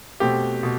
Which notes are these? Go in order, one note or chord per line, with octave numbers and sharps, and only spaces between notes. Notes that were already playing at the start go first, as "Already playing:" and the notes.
B2 A3 C4 G4
B2